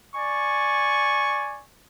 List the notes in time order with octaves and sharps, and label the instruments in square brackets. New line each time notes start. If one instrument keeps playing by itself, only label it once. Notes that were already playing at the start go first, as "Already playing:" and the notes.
[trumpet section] D5 G#5 C#6